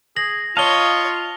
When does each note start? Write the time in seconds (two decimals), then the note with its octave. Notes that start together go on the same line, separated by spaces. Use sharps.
0.16 G#4 A#6 F#7
0.57 F4 C#5 D#5 F5 A5 G7